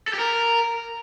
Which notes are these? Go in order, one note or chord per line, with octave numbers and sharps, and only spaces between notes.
A4
G4
A#4